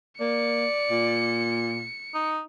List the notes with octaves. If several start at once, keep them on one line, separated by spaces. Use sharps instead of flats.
A#3 D5 C#7
A#2
D#4